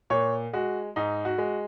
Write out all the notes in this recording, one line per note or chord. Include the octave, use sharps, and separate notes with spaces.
A#2 C#5
G#3 F#4
G#2 D#4
F#4
G#3